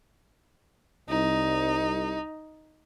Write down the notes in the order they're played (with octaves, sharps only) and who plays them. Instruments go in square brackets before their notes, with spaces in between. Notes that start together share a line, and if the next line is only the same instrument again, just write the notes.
[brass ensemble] C2 [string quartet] D#4